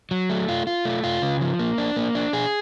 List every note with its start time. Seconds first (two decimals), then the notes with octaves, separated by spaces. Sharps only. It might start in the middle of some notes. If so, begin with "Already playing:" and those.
0.11 F#3
0.30 A3
0.48 F4
0.67 F4
0.85 A3
1.04 F4
1.22 C#3
1.41 F3
1.59 A#3
1.78 D4
1.96 A#3
2.15 D4
2.33 G#4